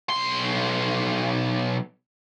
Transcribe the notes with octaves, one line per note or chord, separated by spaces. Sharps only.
B1 C6